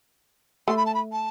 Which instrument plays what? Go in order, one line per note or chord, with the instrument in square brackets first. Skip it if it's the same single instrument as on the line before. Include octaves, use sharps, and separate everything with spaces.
[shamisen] A3 [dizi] C6
[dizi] B5
A5
B5
A5